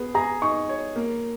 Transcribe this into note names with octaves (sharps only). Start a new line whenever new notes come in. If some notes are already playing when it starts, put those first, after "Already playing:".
Already playing: B3 G#4
G#4 A#5
D#4 C#6
C#5
A#3